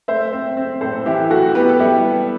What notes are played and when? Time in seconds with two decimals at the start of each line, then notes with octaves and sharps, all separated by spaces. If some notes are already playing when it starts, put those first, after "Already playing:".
0.08 A3 C5 E5
0.33 C4
0.57 C4
0.81 A2 A4 C5
1.06 E3 E4 G4
1.30 A3 F#4 A4
1.55 B3 G4 B4
1.69 A4
1.80 G3 E4 G4
2.04 B3